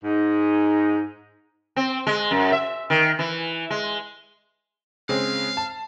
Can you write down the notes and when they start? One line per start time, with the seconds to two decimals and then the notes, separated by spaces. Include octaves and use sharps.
0.03 G#2 D#4
1.76 C4
2.07 G#3
2.31 F#2
2.52 E5
2.90 D#3
3.19 E3
3.70 G#3
5.09 C#3 G#3 C4 F5
5.57 A5